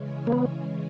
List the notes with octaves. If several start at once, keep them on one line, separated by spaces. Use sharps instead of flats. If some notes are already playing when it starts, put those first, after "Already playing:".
Already playing: C#3 E3 G#3 C#4
A#3
B3